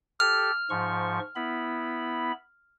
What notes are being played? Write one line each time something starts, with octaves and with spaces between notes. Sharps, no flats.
G4 A4 F6
G#2 F3 C#6
B3 E4 B5